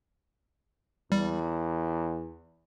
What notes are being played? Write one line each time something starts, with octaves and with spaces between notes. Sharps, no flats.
E2 G3